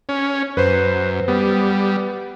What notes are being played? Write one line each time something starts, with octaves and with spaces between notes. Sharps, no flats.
C#4
F#2 B4 C5
G3 B3